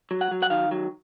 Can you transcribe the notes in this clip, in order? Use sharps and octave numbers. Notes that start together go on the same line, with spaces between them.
F#3
F#5
F#3
F#5
D#3 F5
F#3